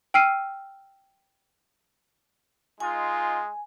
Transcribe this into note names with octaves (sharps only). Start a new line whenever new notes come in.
G5 E6 F6 C7 D#7
G#3 D#4 F4 G#5